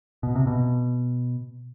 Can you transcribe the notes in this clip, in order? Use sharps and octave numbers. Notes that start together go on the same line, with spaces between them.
B2
C3
B2